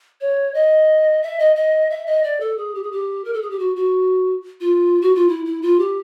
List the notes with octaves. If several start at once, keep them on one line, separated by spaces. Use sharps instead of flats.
C#5
D#5
E5
D#5
D#5
E5
D#5
D5
A4
G#4
G4
G#4
G4
A#4
A4
G#4
G4
F#4
F#4
F4
F#4
F4
E4
E4
F4
G4